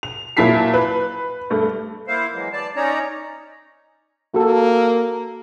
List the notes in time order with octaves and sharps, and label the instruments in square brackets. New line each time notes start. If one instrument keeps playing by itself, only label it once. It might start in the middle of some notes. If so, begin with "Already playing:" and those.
[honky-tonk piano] F7
A#2 F#3 E4 A5 B6 C7
B4
G2 A3
[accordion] A#3 E4 C5 F5
E3 F#3 G#3
D5 A5
C#4 D#4 C#5 D5 A#5
[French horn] A#3 [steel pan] F#4 A4